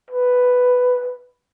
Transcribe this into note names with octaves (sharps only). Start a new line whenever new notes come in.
B4